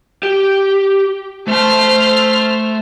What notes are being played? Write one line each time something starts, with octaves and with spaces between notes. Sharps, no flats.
G4
A3 C5 A5 F6